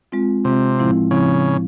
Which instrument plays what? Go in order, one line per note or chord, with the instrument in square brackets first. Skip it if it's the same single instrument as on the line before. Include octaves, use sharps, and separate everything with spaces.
[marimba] G#3 C4 F4
[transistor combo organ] C3 [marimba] G#3 C4 F4
[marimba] A2 F3 G#3 C4 E4
[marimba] A2 F3 C4 E4 [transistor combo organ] C#3